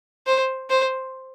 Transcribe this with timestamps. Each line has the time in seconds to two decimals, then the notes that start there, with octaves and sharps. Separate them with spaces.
0.27 C5
0.70 C5